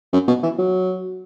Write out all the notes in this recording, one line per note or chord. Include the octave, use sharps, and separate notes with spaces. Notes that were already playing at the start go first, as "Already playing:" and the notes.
F#2
B2
E3
F#3